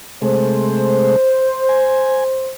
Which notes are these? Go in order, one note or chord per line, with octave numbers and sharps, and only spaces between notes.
C3 G#3 A3 C5
G#5